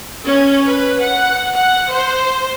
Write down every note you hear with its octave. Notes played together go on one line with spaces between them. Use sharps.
C#4
B4
F#5
F#5
C5